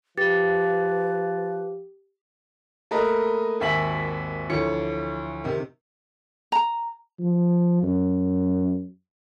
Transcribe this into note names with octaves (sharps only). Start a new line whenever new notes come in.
F3 G4 B4 A6
A3 A#3 A#4 B4 D#5
G#1 D#2 E5 G#5 B6 F#7
D2 E3 F3 C#5 C#7
C3 D#3
A#5
F3
F#2